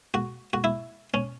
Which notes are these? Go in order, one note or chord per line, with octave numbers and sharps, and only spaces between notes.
F#4
F#4
E4
C#4